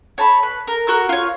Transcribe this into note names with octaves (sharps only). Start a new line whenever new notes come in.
C#5 A5 B5
B4
A#4
F#4 A#4 E6
F4 C#5